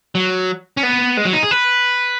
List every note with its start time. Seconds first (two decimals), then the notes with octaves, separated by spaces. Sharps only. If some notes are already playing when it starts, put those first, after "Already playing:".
0.15 F#3
0.77 C#4
0.83 B3
1.17 G#3
1.25 F#3
1.33 D#4
1.43 G#4
1.51 B4